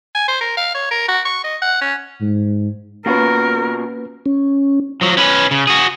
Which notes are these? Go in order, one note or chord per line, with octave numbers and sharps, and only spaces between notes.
G#5
C5
A#4
F5
C#5
A#4
F#4
C#6
D#5
F#5
C#4
G#2
B2 A#3 C#4 F4 F#4 A#4 B4
C#4
F3 F#3
C#4 B4
C#3
F#4 G#4